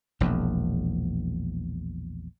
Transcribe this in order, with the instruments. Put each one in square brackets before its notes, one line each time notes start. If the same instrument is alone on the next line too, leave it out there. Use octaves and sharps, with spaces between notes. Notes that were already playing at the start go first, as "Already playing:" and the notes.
[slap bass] E1 A#1 E2